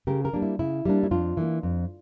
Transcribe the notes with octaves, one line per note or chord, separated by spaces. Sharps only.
C#3 G4 A#4
G4 A#4
G3 A#3 D4
E4
C#3 E4
G3 A#3 D4
E4
F2 D4 F4
E3 A#3
F2